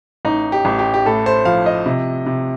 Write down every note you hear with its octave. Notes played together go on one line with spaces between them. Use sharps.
A1 D#4
G4
A1
G4
G4
A2 A4
C5
F3 F5
D#5
C3
C3